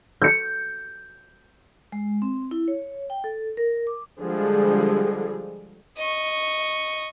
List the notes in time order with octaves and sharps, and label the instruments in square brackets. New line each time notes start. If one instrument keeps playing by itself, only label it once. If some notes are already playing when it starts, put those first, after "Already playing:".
[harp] G6 C#7
[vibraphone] G#3
C4
E4
C#5
G5
A4
A#4
D6
[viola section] D3 F3 G3 G#3 G#4
[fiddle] D#5 C#6